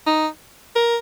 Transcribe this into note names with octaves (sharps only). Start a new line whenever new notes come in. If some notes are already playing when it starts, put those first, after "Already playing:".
D#4
A#4